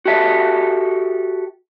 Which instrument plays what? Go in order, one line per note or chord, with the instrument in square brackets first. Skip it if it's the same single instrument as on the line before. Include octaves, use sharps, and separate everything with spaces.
[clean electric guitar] F#4 G4 A4 E5